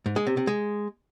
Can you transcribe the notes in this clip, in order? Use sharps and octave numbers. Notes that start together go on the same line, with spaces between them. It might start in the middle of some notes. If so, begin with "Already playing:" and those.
G#2
G#3
C3
C3
G#3